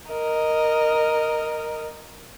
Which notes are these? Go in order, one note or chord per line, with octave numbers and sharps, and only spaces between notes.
A#4 D#5